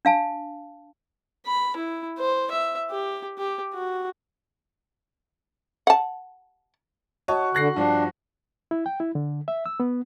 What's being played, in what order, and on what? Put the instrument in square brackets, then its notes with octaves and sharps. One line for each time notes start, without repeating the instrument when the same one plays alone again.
[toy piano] D4 F5 A5
[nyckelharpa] B5
E4
C5
E5
G4
G4
F#4
[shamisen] F#5 A5
[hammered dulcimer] F#4 [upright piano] C#5 D#5 A5
[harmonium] D3 [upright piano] F#6 A#6 C7
[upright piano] G2 F3 [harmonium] D4
[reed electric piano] E4
G5
E4
D3
E5
E6
B3